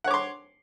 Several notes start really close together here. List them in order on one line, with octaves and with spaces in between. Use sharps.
F#5 C#5 D6 C6